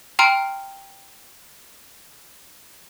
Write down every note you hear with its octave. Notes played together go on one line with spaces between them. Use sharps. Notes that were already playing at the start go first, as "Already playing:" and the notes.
G5 A#5 C6 F6 D7